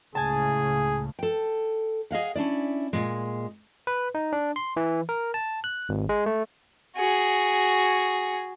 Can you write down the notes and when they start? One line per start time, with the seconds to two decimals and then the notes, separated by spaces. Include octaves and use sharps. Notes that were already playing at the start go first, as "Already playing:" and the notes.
0.15 C#2 A2 C#3 G#4 G#5 A5
1.19 A4 G5
2.11 G#4 D#5 F5 F#5
2.35 C#4 D4 E4 D5
2.93 A#2 G#3
3.87 B4
4.15 D#4
4.33 D4
4.56 C6
4.77 E3
5.09 A#4
5.34 A5
5.64 F#6
5.89 G#1
6.09 G#3
6.26 A3
6.97 F#4 G#4